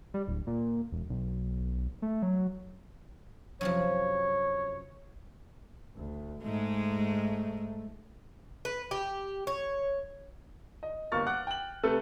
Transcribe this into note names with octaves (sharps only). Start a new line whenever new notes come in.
G3
D1
A#2
E1
B1
A3
F#3
F#2 C3 F3 C#5
D2
G#2 G#3 A3
B4
G4
C#5
D#5
G1 A#3 C#6 F6 A6
F#5 D6 F#6
G5 F#7
C3 A3 A4 B4